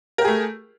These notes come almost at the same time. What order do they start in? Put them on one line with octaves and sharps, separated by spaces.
A#4 G4 G#4 A3